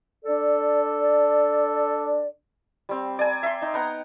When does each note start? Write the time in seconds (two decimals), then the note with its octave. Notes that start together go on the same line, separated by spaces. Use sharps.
0.25 D4 A4 D5
2.89 G3 C4
3.19 D5 G#5 A#5
3.43 E5 C6
3.62 D#4
3.74 B3 F#5 G5 A#5